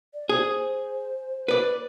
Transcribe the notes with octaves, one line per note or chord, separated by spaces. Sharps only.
D5
G#4 C5
B4 D5